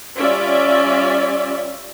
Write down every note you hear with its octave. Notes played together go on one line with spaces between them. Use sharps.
G3 C#4 F4 D5 E5